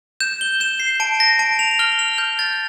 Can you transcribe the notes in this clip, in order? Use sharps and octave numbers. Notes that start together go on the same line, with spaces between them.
G6 E7
G7
G6 E7
C7
A5 D7
A#6
A5 D7
F7
F7
F6 G7
F7
F6 G6
A6